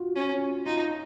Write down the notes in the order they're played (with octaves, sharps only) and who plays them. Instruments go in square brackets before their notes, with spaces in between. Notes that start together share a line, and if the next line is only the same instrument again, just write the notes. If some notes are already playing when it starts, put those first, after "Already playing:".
Already playing: [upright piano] F4 F#4
[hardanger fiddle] C#4
[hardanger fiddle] D#4 [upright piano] F4